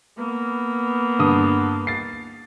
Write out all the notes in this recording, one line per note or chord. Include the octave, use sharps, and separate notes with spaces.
A#3 B3
G2 D3 D#6
A6 C7